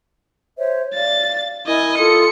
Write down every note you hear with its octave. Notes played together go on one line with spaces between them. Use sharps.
C5 C#5 E5
D5 F5 A6
E4 A#4 D#5 G#5
F4 A4 D#6 C#7